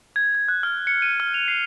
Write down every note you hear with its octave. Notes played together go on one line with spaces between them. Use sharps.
G#6
G#6
F#6
F6
C#7
D#7
F6
F7
C7